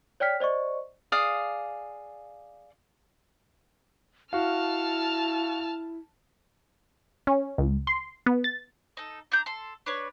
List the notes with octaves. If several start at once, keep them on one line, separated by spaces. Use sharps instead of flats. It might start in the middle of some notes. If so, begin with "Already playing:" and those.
C#5 D5 G5 F6 B6
C5 D5 D#5 C#6
G#4 D5 F5 D#6
E4 F#4 F5 A5 F6
C#4
C#2
C6
B3
A6
D#4 A4
D4 A#5 G6
A4 C6
D4 B4 C#5